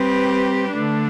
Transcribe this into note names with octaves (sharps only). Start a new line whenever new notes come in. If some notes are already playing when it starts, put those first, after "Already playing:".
Already playing: G3 C4 G4 B4
D3 A3 D4